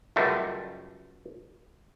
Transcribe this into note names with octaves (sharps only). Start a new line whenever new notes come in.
C#2 F#2 G3 A3